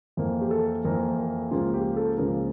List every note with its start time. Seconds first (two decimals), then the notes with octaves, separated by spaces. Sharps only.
0.17 F2 E3 A#3
0.41 G4
0.51 A4
0.84 F2 E3 A#3 A#4
1.17 A#4
1.51 C#2 C#3 F3 A#3 F4
1.74 G4
1.96 A4
2.18 C#2 C#3 F3 A#3 A#4